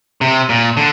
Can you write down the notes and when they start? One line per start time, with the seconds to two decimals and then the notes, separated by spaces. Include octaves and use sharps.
0.21 C3
0.49 A#2
0.77 D3